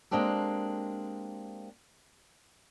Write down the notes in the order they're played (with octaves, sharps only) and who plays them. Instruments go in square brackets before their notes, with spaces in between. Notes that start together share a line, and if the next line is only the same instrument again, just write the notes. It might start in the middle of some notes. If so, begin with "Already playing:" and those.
[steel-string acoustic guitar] G#3 A#3 C4 D4 G4 A4